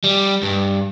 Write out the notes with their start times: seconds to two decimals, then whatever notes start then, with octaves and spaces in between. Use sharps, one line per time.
0.04 G3
0.43 G2